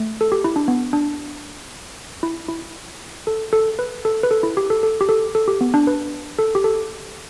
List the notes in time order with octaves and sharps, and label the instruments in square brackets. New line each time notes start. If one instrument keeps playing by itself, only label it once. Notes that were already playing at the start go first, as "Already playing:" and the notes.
Already playing: [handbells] A3
A4
G4
E4
D4
B3
D4
E4
E4
A4
A4
B4
A4
B4
A4
E4
G4
A4
A4
G4
A4
A4
G4
B3
D4
B4
A4
G4
A4